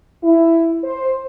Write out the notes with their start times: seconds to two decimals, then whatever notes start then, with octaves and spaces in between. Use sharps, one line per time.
0.23 E4
0.83 C5